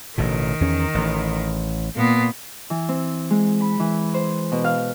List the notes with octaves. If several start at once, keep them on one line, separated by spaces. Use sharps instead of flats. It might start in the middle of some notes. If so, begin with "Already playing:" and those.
A1 B2 D3 D#3
E2 C#4
A1
A#2 B3
E3
C4
G#3
B5
E3
C5
B2
F5